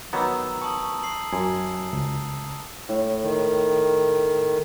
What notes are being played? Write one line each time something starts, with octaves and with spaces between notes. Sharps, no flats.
D#3 F#3 B3 A#5 D6 E6
A5 C#6 D#6 F#7
C7 F#7
F#2 F#3 G#5
C#2
A2
D#3